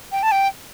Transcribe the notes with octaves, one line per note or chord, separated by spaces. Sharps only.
G5
A5
G5